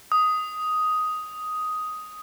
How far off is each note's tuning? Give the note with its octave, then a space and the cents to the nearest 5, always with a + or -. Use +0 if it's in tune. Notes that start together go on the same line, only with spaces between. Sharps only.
D#6 +5